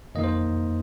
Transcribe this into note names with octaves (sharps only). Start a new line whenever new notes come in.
F2 D#3 A#3 D#4 D#5
C5